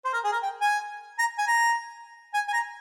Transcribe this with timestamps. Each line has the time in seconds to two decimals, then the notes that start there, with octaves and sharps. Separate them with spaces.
0.05 C5
0.13 A#4
0.24 G#4
0.32 A#4
0.42 G5
0.61 G#5
1.19 A#5
1.38 G#5
1.47 A#5
2.34 G#5
2.48 G#5
2.53 A#5